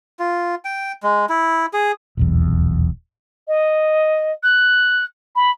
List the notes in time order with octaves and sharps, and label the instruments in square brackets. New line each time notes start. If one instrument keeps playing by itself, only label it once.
[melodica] F4
G5
G#3
E4
G#4
[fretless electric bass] D#1 B1 E2
[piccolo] D#5
F#6
B5